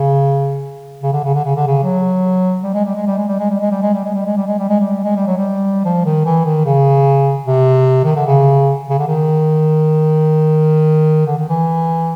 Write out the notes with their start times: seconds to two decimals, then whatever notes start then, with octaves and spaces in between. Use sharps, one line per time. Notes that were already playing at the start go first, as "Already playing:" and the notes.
Already playing: C#3
1.03 C#3
1.13 D3
1.24 C#3
1.35 D3
1.45 C#3
1.56 D3
1.67 C#3
1.83 F#3
2.63 G3
2.74 G#3
2.85 G3
2.95 G#3
3.07 G3
3.18 G#3
3.28 G3
3.39 G#3
3.50 G3
3.61 G#3
3.71 G3
3.82 G#3
3.94 G3
4.04 G#3
4.14 G3
4.26 G#3
4.37 G3
4.47 G#3
4.58 G3
4.69 G#3
4.80 G3
5.04 G#3
5.16 G3
5.27 F#3
5.38 G3
5.85 F3
6.05 D#3
6.25 E3
6.45 D#3
6.65 C#3
7.46 C3
8.05 D#3
8.16 D3
8.26 C#3
8.90 C#3
8.99 D3
9.07 D#3
11.27 D3
11.38 D#3
11.49 E3